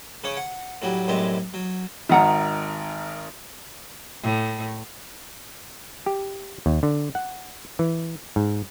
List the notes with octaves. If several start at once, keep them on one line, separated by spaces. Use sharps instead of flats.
C#3 C#4 C#5
F#5
A2 F#3 G3
F#2 A2 G3 G#3 C4
F#3
G#1 D#3 E5 F#5 A#5
A2
G4
D#2
D3
F#5
E3
G#2